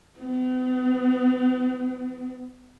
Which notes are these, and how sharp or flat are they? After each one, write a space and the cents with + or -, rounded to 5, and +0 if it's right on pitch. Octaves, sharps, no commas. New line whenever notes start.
B3 +45